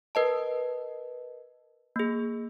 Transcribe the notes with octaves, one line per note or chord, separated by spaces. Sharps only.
A#4 B4 D#5 A5
A#3 G#4